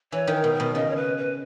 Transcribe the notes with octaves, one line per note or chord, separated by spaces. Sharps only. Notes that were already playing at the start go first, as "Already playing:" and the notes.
E3 C#5
D#3
A#4
B2
A#4
B2
C#3 D#5
C#5
B4
B4